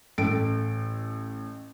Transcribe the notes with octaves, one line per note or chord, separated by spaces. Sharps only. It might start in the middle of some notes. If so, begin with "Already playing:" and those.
A1 A4 D7